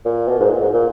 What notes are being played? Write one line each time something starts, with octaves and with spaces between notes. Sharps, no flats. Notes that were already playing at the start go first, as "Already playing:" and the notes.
A#2
B2
G#2
A#2
G#2
A#2